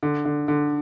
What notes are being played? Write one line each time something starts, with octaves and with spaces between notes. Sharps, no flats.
D3
D3
D3